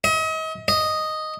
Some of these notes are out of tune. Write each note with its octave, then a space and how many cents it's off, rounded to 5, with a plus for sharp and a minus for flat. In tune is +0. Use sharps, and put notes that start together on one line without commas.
D#5 +40
D#5 +0